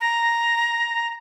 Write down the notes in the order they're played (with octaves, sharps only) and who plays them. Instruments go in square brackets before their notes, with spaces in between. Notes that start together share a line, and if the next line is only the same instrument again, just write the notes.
[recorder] A#5